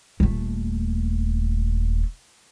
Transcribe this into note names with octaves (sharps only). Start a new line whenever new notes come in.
D#1 A3